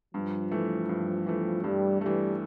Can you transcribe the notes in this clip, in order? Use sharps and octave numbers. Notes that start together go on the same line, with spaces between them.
G2 F3
E3 A3
G2
E3 A3
G2 G3
E3 G3 A3